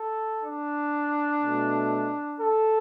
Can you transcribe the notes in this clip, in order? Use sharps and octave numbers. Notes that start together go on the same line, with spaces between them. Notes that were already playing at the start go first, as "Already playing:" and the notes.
Already playing: A4
D4
B2 A3
A4